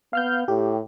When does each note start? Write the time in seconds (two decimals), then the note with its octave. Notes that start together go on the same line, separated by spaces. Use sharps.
0.13 B3 F5 F6 G6
0.48 A2 G4